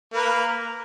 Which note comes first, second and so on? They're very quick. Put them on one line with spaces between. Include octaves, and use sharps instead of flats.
A#3 B4 A#4